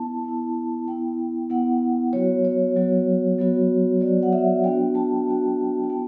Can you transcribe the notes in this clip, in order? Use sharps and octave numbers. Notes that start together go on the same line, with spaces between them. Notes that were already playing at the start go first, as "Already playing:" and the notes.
Already playing: B3 E4 A5
B3 E4
B3 E4 G5
B3 E4 F#5
F#3 B3 F#4 C#5
C#5
F#3 B3 F#4
F#3 B3 F#4
F#3 B3 F#4 D5
F#5
E5
B3 D4 F#4 G5
A5
B3 D4 F#4
A5
B3 E4 G5